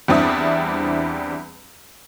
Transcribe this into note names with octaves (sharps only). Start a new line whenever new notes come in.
E2 G3 C4 D4 E4 D#6